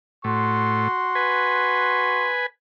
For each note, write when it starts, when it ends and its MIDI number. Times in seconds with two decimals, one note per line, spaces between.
0.24 0.88 45
0.24 2.31 66
0.24 2.31 84
1.15 2.46 71
1.15 2.46 80